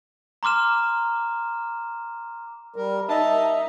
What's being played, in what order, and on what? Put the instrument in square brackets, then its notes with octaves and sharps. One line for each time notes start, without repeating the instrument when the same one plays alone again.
[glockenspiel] A#5 C6 D6 F6 E7
[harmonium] G3 A#4
[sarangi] D#4 [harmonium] E5 [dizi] A5